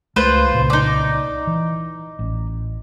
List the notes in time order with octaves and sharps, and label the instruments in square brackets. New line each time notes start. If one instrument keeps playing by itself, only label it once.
[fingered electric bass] C#2 A3 [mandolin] F4 B4 C5
[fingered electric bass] C2 A#2 C#3
[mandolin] D#4 D5
[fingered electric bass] E3
A1